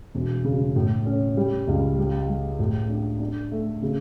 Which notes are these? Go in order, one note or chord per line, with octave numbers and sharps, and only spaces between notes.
E1
C#3
A2
C#4
G3
C#2
G3
G3
A2
D4
D4
A3
C#3